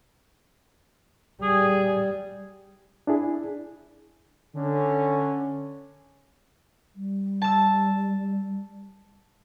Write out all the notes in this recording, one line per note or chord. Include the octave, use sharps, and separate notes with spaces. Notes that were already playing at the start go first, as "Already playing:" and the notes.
G3 G#4
D4 E4 G#4
D3 C#4
G3
A5 E6